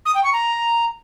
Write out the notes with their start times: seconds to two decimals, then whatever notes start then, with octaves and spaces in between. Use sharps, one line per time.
0.06 D#6
0.15 G5
0.24 C#6
0.33 A#5